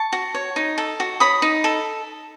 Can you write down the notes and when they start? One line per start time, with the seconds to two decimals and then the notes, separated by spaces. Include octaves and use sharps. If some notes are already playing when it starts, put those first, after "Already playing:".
Already playing: A5 C#6
0.12 F#4
0.34 C#5
0.56 D#4
0.78 A4
1.00 F#4
1.20 C#5 B5 D#6
1.42 D#4
1.64 A4